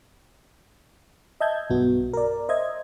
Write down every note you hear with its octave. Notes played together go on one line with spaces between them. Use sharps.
D#5 E5 A5 G6 G#6
B1 G2 B3 F#4
A#4 D5
C5 D#5 E5 G#6